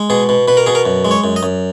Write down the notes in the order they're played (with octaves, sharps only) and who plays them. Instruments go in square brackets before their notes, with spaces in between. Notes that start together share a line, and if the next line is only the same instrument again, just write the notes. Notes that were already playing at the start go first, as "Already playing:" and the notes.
Already playing: [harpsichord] G#3
B2 G#4
B2
B2 B4
A#4
B2 G#4
A#4
F#2
G#3
C#5
F#2
D#5
F#2